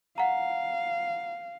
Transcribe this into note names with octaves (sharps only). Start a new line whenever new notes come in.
F5 F#5 A#5